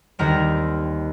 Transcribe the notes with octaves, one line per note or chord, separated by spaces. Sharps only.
D#2 D#3 G3 C4 A#4